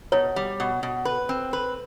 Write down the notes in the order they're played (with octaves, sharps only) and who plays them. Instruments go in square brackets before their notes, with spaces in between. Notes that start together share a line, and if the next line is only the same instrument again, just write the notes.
[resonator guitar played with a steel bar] B2 [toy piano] C#5
[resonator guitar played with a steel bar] G3
B2
B2
B4
C4
B4